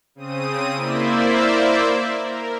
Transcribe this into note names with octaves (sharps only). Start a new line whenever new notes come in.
C#3 C4 D#6 D#7
A#3 E4 C5 D5 E5
A#4